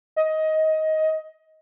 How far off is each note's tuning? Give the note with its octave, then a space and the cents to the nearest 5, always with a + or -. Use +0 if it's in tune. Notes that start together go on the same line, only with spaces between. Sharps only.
D#5 +15